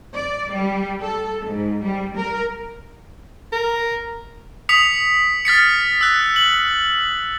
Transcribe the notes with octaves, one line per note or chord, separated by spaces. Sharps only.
D5
G3
A4
G#2
G3
A#4
A#4
D#6 B6 C#7 F7
F6 A6 B6 C#7
E6 F#6
F#7